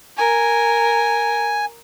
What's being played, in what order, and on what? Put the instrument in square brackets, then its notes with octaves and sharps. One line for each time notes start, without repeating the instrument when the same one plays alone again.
[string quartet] A#4 [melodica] G#5